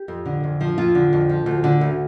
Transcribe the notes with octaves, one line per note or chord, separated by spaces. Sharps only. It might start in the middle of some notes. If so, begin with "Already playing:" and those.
Already playing: G4
F2
D3
F2
F3
F2 F4
D3
F2
F3
D2
D3
D2